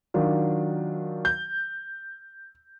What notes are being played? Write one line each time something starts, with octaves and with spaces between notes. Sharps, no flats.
D#3 F#3 D4 F4
G6